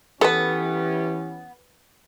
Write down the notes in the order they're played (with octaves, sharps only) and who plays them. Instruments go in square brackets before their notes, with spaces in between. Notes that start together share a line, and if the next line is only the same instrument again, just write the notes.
[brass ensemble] E3 C#4 G4 [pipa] B3 [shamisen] A4 B4